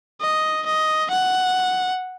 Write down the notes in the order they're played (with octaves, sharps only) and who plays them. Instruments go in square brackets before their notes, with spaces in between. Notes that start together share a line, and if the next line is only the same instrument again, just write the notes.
[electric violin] D#5
D#5
F#5